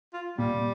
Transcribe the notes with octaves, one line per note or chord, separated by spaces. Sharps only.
F4
A#2 G3